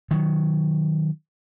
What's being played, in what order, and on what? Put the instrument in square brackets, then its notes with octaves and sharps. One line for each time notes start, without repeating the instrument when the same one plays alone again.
[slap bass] D#3 F#3